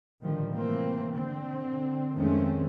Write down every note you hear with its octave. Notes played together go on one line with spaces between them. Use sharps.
A2 D3 D#3 F3 G3
C3 E3 A3 A#3 C4
D3 C4
F2 D#3 G#3 A3 C4 C#4